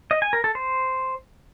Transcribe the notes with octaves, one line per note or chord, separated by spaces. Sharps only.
D#5
G#5
A#4
A4
C5